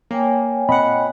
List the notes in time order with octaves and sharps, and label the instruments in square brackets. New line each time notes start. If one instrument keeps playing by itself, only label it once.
[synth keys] A#3 [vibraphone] C#5 G5 G#5
[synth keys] A#2 F#5 [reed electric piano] C4 D#5 B5